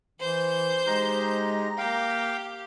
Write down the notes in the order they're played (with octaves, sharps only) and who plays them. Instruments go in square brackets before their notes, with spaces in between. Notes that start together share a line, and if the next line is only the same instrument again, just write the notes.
[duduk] E3 [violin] C5 G6
[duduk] G#3 [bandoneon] D#4 G4 [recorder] A#5
[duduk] A#3 [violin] G4 [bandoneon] F5 G5